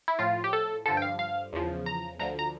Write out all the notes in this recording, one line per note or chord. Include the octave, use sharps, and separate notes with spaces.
E4
A2 F3 F4
G4
A4
G2 D3 F3 A4
G5
F5
F5
E2 C#3 F3
A#5
D2 D3 F3 A#5
A#5